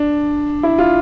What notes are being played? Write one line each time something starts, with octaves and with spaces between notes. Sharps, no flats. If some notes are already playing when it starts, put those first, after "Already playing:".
Already playing: D4
E4
F4